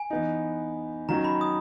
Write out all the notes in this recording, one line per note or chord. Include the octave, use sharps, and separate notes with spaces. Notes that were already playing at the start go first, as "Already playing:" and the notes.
Already playing: G#5
E3 B3 D#4
D#3 F#3 C#4 A#5
B5
D#6